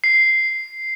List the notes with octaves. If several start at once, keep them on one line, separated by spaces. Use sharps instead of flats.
C7